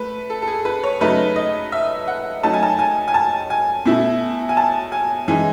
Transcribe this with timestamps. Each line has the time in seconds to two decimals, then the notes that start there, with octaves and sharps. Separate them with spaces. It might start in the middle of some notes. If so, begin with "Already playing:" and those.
Already playing: A3 B4
0.30 A4
0.42 A4
0.47 G#4
0.65 B4
0.83 C#5
1.01 C#3 F#3 A3 D#4 B4
1.36 D#5
1.72 E5
2.08 F#5
2.43 F#3 A3 D#4 A5
2.54 G#5
2.63 A5
2.79 G#5
3.08 G#5
3.14 A5
3.50 G#5
3.86 B2 A3 E4
4.49 G#5
4.57 A5
4.92 G#5
5.28 E3 G#3 D#4 G#5